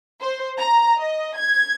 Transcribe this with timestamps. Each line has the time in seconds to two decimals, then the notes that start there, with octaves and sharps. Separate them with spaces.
0.20 C5
0.57 A#5
0.98 D#5
1.37 G#6